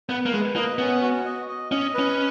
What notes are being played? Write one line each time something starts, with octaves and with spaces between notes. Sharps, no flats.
B3 B4
A#3
G#3 B4
A#3 D#5
B3 C#4
F#4
D#5
D#5
C#4 D#5
C#4 B4